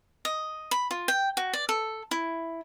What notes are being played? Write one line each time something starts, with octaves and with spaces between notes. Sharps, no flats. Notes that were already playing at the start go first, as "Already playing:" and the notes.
D#5
B5
F4
G5
F#4
D5
A4
E4